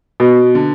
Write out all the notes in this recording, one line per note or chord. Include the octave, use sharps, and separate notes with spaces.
B2
D3